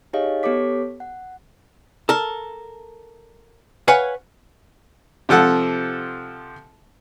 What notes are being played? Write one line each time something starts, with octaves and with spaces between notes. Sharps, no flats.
D#4 G4 G#4 C#5 D#5 F5
B3 G4 A4 C#5 D6 B6
F#5
A4 A#4
B4 C#5 F5 F#5 G#5
C3 F3 A4 F#5